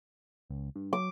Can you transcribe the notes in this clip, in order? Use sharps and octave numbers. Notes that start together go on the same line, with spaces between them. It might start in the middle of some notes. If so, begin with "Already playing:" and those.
C#2
G2
F#3 D6